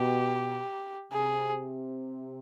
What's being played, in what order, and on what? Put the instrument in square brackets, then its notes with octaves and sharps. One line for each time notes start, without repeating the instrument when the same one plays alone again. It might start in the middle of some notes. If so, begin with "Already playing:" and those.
Already playing: [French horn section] B2 [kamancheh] G4
[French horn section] C3 [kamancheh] G#4